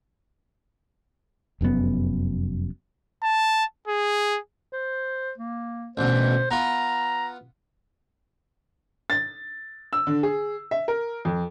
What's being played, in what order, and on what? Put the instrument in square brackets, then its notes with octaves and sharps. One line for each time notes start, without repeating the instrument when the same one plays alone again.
[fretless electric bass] F1 F#2 A#2 B3
[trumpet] A5
G#4
[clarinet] C5
A#3
[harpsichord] A1 D2 B2 [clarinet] C5
[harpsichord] B3 F4 [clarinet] A#5
[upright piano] A6
E6
D3
G#4
E5
A#4
F2